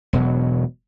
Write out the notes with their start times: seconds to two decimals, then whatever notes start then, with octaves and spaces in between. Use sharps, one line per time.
0.13 E1 B2 F#3